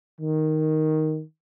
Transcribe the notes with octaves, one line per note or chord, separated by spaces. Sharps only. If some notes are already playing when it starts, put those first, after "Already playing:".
D#3